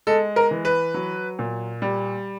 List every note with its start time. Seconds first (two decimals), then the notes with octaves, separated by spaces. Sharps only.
0.07 G#3 A4
0.36 A#4
0.51 E3
0.65 B4
0.94 F#3
1.39 A#2
1.82 G3